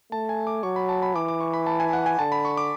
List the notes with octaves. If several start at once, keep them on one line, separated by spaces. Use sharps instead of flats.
A3 A5
G#5
D6
F#3 C#6
B5
A5
B5
E3 D6
D6
C#6
B5
A5
G#5
F#5
G#5
D3 A5
B5
C#6
D6